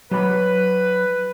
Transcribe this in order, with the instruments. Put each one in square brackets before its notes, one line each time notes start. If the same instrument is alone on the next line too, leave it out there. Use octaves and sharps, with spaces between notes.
[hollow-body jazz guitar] F#3 B5 [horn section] B4